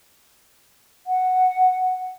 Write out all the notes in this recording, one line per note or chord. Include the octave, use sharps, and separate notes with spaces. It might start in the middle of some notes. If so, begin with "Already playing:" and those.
F#5